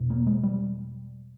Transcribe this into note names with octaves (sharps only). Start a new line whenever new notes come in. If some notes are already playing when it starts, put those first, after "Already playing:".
Already playing: E2 B2
A#3
G#3
G3